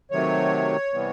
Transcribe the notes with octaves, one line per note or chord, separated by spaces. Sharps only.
C3 D#3 F#3 A3 C#5
C3 E3 G3 B3